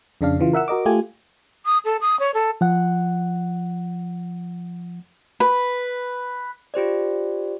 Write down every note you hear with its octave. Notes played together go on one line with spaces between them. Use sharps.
F2 C#3 D4 F5
C#3 E3 F4
A#4 E5 F#5 E6
F#4 A#4 D#5 D6
A3 F4 G4 G#5
D#6
A4
D#6
C#5
A4
F3 F#5
B4
F4 G4 C5 D5